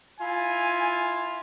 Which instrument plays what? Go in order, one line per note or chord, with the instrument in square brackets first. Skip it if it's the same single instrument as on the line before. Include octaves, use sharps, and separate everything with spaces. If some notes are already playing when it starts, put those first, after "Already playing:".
[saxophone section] E4 F4 [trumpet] G#5